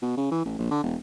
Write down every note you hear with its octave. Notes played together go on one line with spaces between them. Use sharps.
B2
C#3
E3
A1
A#1
D3
E1